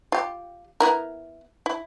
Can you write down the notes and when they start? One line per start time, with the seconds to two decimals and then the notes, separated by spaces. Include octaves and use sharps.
0.12 F4 G4
0.80 B3 E4 A#4
1.66 E4